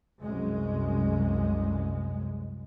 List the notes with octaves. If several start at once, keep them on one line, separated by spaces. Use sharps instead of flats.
C2 F#2 G#3